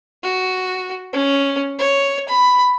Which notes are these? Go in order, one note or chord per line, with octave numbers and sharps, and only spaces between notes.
F#4
C#4
C#5
B5